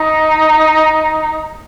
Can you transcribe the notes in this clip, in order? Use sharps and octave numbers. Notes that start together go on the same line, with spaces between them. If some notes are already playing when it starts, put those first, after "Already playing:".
Already playing: D#4